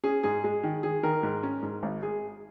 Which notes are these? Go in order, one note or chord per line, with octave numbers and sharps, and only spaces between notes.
C#4 G#4
G#2 G#4
G#3 G#4
D#3
D#3 G#4
D#3 A#4
G#2
C#4
G#2
G#1
G#4